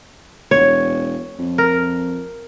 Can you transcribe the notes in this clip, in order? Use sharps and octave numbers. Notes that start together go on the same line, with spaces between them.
E1 C#5
F2
A#4